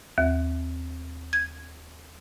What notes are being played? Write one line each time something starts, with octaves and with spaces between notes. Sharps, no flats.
D#2
G#6